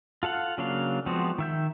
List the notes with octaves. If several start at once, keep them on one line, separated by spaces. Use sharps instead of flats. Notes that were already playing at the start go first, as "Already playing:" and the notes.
F4 A4 F5 F#5
C#3 F#3 A#3 D4 F5
F3 G#3 B3 C4 F#4
D#3 E5 G6